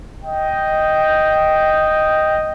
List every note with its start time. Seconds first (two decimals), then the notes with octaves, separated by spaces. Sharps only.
0.23 D#5 G5